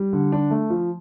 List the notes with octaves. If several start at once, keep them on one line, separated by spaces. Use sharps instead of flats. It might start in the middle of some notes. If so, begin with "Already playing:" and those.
Already playing: G3
D3
D4
A3
F3